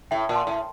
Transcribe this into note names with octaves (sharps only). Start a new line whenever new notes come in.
A2 E5 G5
A#2
A5 C6
A2